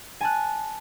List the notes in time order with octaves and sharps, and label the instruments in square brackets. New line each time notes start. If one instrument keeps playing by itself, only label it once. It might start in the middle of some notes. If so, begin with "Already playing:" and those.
[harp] G#5 A5 F#6